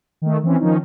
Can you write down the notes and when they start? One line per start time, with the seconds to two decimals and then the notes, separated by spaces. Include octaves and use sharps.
0.22 D#3 A3
0.43 E3 C4 C#4
0.60 D#3 F3 C#4 D#4